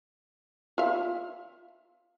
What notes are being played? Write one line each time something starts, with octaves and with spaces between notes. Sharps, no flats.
F4 E5 F5